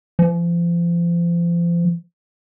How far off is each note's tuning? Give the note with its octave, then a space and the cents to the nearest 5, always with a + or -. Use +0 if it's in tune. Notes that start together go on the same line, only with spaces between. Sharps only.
F3 -35